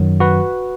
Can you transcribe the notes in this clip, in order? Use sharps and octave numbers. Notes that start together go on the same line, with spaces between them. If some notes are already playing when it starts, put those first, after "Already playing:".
Already playing: F#2 D#3 F#3
F#4 B4